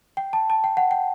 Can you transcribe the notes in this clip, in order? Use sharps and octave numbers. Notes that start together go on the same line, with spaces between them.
G5
A5
A5
G5
F#5
G5